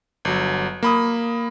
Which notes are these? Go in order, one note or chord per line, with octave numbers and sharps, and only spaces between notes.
G1 F#3
A#3 B5 D#6